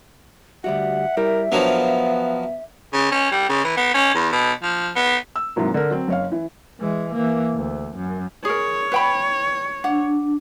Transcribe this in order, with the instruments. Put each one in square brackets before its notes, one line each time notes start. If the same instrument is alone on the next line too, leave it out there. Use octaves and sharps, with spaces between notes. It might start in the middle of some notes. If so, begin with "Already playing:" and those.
[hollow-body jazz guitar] D2 G3 F#4 [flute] E5 [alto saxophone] F#5
[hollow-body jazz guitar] G3 E4 [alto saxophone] A#4
[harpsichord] F3 F#3 [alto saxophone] B3 [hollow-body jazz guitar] D4 A#4 C#5
[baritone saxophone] C#3
C#4
G3
C#3
E3
B3
C#4
E2
B2
F3
B3
[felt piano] E6
G#2 C3 E3 F#3 A#3
D3 A#4
F#3 C4
F#1 C#5 F5
E3
[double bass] E3 G#3
E3 A#3
D2
F#2
[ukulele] G#4 A#4 [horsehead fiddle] C#5
[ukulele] B4 G5 B5
[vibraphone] D4 [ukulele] F#5